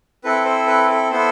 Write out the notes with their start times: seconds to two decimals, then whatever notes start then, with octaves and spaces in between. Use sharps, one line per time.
0.24 C4 E4 A4 B4
0.45 C5
0.67 B4
0.89 A4
1.11 B3 E4 A4 C5